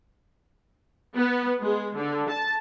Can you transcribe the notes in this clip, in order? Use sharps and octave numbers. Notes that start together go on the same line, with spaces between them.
B3
G#3
D3
A5